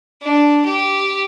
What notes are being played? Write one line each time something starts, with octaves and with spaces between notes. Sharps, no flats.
D4
G4